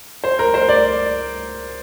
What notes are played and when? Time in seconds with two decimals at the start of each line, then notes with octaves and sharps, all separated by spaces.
0.24 C5
0.39 A#4
0.54 C5
0.69 D5